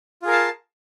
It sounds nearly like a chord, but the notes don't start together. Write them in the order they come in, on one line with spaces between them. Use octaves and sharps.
F4 G#4 A#4 F5 A5